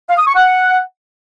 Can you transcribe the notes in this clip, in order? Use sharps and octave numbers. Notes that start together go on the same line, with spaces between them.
F5
D#6
C#6
F#5